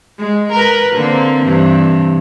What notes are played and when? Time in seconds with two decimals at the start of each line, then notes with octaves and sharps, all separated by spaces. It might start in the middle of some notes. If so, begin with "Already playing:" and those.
0.18 G#3
0.52 A#4 B4
0.95 D3 A#3 C4
1.43 G2 C3 E3